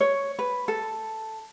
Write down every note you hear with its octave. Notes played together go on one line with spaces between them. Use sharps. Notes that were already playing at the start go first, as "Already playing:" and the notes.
C#5
B4
A4